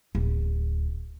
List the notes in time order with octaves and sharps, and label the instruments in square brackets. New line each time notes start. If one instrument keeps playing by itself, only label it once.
[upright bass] D1